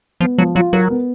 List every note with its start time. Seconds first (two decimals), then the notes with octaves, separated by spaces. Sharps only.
0.20 F3 B3
0.38 F3 F#3
0.55 F#3 F4
0.73 F#3 A#4
0.90 B3